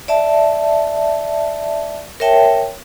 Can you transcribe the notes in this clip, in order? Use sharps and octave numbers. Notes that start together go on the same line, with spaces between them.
D5 E5 A5
A#4 C#5 E5 G5 A5